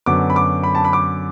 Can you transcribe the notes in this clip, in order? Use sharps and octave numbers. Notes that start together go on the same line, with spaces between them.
F#2 D3 F#3 B3 D6
B5
D6
B5
A5
B5
D6